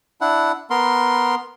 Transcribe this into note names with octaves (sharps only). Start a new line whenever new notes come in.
D4 E4 F#5
B3 A#4 C6